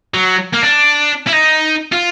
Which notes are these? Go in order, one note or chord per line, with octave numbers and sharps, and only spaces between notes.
F#3
A#3
D4
E4
D#4
F4